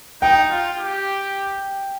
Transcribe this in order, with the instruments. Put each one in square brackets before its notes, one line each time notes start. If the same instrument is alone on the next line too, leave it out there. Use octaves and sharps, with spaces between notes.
[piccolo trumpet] D#4 [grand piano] G5
[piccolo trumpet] F4
G4